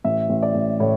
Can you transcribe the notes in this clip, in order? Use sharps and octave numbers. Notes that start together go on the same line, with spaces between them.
A1 E5
A1
D5
A1
A2 C#5